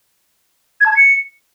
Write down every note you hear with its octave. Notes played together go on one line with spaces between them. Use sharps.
G#6
A5
G#6
C#7